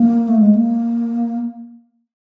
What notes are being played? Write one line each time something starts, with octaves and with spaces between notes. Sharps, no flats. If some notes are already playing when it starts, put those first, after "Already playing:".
Already playing: A#3
A3
G#3
A#3